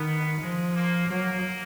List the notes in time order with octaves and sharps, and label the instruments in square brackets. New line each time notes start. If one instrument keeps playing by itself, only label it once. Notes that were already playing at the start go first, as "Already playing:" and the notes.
Already playing: [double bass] D#3 [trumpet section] B3
[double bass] F3 [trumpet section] G#3
[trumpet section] A#3
[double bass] F#3 [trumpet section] A#3